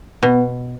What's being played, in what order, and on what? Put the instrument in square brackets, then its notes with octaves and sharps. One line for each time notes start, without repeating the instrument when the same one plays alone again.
[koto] B2 [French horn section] B3